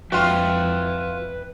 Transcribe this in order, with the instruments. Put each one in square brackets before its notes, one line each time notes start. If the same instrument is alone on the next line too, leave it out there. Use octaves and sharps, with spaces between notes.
[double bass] F2 [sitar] F4 F#4 [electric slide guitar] B4 E5 G5